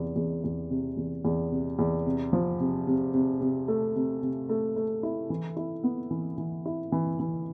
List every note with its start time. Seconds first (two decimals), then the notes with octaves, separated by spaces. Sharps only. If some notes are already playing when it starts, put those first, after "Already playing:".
Already playing: E2 C3
0.16 E2
0.44 E2
0.70 C3
0.97 E2
1.25 E2
1.52 C3
1.79 E2
2.06 C3
2.33 F3
2.60 C3
2.87 C3
3.14 C3
3.41 C3
3.68 A3
3.95 C3
4.22 C3
4.49 A3
4.76 A3
5.03 E4
5.30 E3
5.57 E4
5.84 B3
6.11 E3
6.38 E3
6.66 E4
6.92 E3
7.19 E3